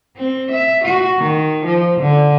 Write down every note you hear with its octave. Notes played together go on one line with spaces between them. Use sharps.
C4
E5
F#4
D#3
F3
D3